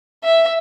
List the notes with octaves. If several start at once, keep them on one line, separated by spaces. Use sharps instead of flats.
E5